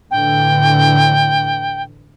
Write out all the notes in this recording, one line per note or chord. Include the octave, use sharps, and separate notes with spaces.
A2 D3 E3 G5